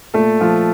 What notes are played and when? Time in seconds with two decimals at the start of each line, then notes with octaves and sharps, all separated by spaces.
0.14 A#2 A3 A4
0.41 A#2 F3 F4